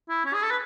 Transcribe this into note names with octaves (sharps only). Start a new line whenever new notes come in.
E4
C#4
G#4
A4
B4